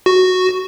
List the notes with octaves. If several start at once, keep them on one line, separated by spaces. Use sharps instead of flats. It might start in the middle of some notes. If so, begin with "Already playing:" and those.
F#4